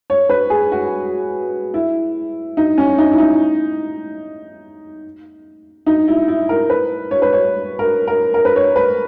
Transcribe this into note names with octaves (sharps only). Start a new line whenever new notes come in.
C#5
B4
G#4
F#4
E4
D#4
C#4
D#4
E4
D#4
D#4
E4
E4
A#4
B4
C#5
B4
C#5
A#4
A#4
A#4
B4
C#5
B4